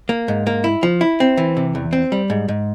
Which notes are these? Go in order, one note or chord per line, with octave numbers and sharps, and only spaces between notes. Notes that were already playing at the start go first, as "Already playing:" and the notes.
A#3
G#2
A#3
E4
F3
E4
C4
E3
C3
E2
C4
G3
G#2
G#2